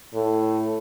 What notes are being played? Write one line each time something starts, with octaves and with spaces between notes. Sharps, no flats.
A2